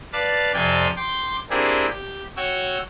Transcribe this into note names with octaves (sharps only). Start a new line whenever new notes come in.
B4 D5 F5 A5
F2 C3 D5 F5 G5 G#5
G5 C6 D6
A#3 C4 D4 E4 G4 G#4
G4
F#4 C#5 G5 E6